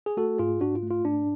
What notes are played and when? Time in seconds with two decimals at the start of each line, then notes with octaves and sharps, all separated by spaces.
0.06 G#4
0.17 A3 F#4 A4
0.39 G#2 F4 G#4
0.61 G#2 D4 F#4
0.76 F4
0.83 A3
0.90 F4
1.05 G#2 D4